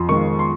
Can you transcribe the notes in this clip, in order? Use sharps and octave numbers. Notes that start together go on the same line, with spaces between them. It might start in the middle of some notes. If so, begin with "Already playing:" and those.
Already playing: F2 C6
D#3 G#3 C#6
C6